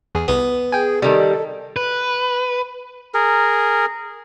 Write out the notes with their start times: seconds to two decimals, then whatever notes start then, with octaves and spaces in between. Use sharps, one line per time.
0.15 E2 G#4
0.28 C2 B3
0.72 G#4 G5 G#5
1.02 C3 D#3 G3 A4
1.76 B4
3.14 G#4 A#4